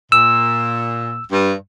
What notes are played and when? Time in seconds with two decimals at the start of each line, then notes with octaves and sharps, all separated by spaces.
0.12 A#2 E6
1.32 G2